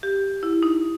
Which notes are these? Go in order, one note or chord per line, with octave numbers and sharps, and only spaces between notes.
G4
E4
D#4